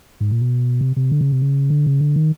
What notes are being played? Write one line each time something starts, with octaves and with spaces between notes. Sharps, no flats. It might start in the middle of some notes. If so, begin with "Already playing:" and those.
G#2
A#2
B2
C3
C3
D3
C#3
C3
C#3
D3
C#3
D3
D#3